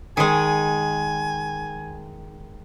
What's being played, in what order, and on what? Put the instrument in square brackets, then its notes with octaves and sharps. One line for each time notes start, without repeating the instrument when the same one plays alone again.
[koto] D#3 G#3 [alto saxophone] G#5